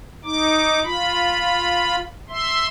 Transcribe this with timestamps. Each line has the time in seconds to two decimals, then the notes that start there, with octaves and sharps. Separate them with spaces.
0.24 D#4 D6
0.84 F4 B5
2.29 E5 C6